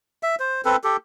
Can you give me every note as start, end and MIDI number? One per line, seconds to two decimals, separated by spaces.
0.23 0.35 76
0.40 0.61 72
0.65 0.76 60
0.65 0.76 69
0.65 0.76 71
0.84 0.97 67
0.84 0.97 69